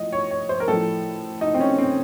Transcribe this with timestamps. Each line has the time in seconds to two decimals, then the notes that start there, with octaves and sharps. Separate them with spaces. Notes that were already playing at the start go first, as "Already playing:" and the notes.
Already playing: A2 F3 D#5
0.12 C#5
0.31 C#5
0.49 C5
0.60 A#4
0.68 A2 F3 A4
1.41 D#4
1.54 C4
1.60 C#4
1.78 C4